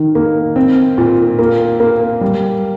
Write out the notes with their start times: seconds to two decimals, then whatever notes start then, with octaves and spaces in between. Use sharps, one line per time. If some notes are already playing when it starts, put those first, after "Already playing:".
Already playing: D#3
0.15 A#3
0.56 C4
0.98 A#2
1.39 A#3
1.80 A#3
2.21 G3